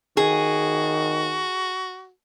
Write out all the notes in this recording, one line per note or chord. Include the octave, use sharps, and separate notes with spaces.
D#3 F#4 G#4